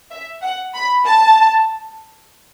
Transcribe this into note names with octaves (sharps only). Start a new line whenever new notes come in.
E5
F#5
B5
A5